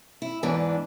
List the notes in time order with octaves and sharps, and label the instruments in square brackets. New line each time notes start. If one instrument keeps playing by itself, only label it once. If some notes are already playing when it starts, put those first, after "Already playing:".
[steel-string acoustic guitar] E4
E2 G#2 E3 D4